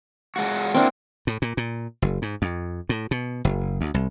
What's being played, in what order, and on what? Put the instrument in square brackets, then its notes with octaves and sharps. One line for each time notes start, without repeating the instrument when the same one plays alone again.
[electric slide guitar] G#3 F4 F#4
[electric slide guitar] A#3 E4 F#4 [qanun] C4 D4
[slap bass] A2
A#2
A#2
F#1
G#2
F2
A2
B2
F#1
D2
C2